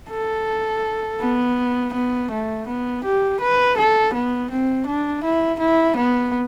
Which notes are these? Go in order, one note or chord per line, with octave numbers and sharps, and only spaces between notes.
A4
B3
B3
A3
B3
G4
B4
A4
B3
C4
D4
E4
E4
B3